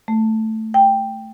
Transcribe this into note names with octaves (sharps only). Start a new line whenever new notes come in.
A3
G5